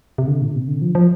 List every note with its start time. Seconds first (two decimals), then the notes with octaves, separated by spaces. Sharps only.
0.18 C3
0.28 D3
0.41 A#2
0.55 C3
0.68 D3
0.82 F3
0.95 F3